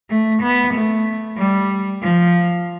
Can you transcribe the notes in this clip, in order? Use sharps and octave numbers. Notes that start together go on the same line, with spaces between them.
A3
B3
A3
G3
F3